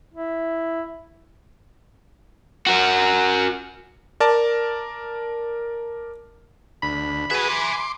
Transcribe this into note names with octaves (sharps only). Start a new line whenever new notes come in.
E4
F#4 A#4
A#4 D5 A5
D2 B5
F#4 G#4 B4 E5 G#5
C6 D6